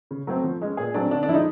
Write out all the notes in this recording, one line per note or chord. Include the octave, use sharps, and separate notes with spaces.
C#3
F#3 A3 C4
F3
G#3 C#4
A#2 G#4
F#3 A3 C4 D4
D3 D4
D4
F3 G#3 D#4 E4